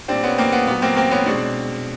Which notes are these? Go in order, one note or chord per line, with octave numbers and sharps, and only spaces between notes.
A#2 G3 C4 D4
B3 C#4
A#3 C4
B3
A#2 F#3 B3
A#3 C4
A#3 C4
B3 C#4
B2 G#3 C4 D4